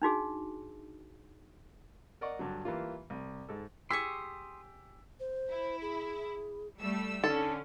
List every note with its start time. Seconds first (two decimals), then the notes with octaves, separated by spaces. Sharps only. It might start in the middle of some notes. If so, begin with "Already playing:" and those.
0.02 D4 D#4 F#4 G#4
2.21 A#4 D5 D#5 F#5 C#6
2.39 G2 D3 F#3
2.65 E3 G3 A#3 F4
3.10 C2
3.49 G#2 A4
3.90 G4 G#4 C6 C#6 D#6 E6 B6
5.20 C5
5.50 E4
5.81 G#4
6.79 G3 A3 E6
7.24 D3 C#4 D#4 A4